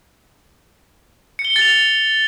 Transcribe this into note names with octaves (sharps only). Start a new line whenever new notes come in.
C#7
G7
C#7
A6
F7